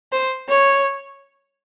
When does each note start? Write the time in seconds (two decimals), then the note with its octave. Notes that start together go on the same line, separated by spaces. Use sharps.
0.12 C5
0.49 C#5